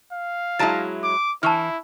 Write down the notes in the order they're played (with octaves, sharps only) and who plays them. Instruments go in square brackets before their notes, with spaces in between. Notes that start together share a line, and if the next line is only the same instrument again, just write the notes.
[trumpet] F5
[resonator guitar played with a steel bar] F#3 G#3 E4 [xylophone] A5 A#5 A6
[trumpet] D6
[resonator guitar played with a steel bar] E3 [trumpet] E4 [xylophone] A5 C#6 F6